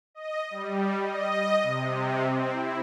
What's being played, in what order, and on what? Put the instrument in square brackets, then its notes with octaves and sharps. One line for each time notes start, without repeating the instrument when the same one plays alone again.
[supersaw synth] D#5
G3
D#5
C3
C4
E4